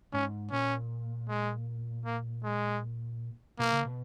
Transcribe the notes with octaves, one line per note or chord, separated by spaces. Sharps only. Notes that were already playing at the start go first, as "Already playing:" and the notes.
G#2 C#4
A#2 C#4
G#3
A#3
G#3
B2 A#3
C#3
B2